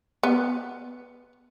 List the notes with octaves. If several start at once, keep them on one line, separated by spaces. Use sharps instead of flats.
B3